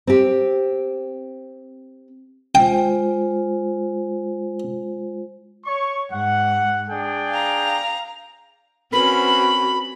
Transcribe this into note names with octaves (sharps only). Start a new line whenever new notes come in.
C4 G4
G#3 F4 C5 G5
C#5 C#6
G#2 F#5
D4 G#4 G5
F5 A#5
C4 C#4 F#4 A#4 B4 B5